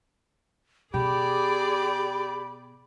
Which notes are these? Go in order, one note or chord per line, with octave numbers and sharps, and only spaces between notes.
B2 G4 G#4 D5 B5